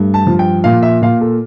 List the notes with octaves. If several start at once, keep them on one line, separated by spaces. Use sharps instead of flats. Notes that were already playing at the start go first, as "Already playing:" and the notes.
Already playing: G2 A3
A5
F3
G5
A#2 F5
E5
A#2 F5
A4